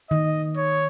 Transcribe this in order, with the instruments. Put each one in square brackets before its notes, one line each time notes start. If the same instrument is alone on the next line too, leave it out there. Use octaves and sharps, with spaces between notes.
[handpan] D#3 [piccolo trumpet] D#5
[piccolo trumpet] C#5